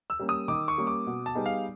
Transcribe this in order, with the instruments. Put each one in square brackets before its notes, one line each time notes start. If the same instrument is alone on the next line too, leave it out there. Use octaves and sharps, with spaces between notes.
[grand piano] E6
[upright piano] G3 A#3 C#4
[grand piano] D#6
[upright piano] D#3 [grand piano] D6
[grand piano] C#6
[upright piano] G3 A#3 C#4
[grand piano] D6
[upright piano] B2
[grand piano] A5
[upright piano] G3 B3 D#4 G#4
[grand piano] F5